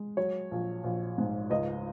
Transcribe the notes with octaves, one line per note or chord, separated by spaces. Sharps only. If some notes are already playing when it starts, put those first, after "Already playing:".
Already playing: G#3
F#3 C#5
A#1
A#1
G#2
C#2 D#5